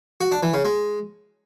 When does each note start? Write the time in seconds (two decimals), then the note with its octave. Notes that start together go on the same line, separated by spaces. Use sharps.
0.21 F#4
0.32 D4
0.43 E3
0.54 C#3
0.65 G#3